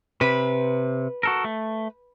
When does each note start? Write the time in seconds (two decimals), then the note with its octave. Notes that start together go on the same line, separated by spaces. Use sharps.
0.21 C3 B4
1.23 F#4 A4 A#4
1.44 A3